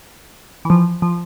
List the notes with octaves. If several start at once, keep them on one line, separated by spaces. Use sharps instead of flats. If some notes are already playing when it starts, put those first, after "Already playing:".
E3
F3
F3